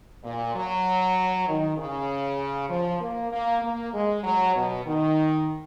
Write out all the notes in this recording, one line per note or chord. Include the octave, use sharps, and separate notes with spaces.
A#2
F#3
D#3
C#3
F3
A#3
A#3
A#3
G#3
F#3
B2
D#3